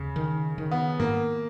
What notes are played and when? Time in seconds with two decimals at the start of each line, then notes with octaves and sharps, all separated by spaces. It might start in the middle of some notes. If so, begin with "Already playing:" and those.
Already playing: D#2 C#3
0.16 D#3
0.58 D#3
0.71 B3
1.00 G#2 A#3